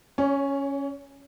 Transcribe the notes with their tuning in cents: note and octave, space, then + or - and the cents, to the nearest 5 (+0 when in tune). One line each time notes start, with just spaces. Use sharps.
C#4 +0 C#5 +30